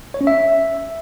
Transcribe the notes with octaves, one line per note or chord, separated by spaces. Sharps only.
C#5
C#4
E5